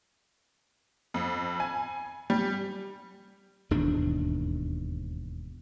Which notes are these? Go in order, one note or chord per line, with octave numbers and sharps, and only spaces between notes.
F2
G#5
G3
E1 D#2 G#2 D4